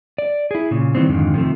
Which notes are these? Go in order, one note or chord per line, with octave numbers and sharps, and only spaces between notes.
D5
E4 G#4
A#2 C#3
D#3 E3 G3 C4
F2 G#2 D3 D#3 F3
C3 D#3 F3 A3